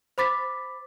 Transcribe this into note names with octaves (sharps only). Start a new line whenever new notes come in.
C5 B5 D6 A6 B6